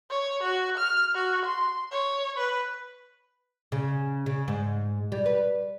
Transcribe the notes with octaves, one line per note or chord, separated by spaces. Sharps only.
C#5
F#4
F6
F#4
C6
C#5
B4
C#3
C#3
G#2
G3
B4